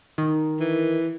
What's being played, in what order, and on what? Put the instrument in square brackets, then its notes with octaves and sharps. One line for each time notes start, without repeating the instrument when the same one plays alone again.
[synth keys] D#3
[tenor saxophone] E3